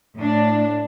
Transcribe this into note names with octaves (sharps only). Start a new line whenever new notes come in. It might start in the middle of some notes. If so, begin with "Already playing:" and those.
A2 D4